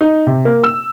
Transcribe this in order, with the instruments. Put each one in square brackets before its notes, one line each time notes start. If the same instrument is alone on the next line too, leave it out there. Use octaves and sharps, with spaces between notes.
[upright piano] D#4
C3
A#3
E6